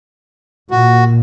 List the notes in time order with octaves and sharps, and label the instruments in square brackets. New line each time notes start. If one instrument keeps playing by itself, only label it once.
[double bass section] A#2 [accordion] F#4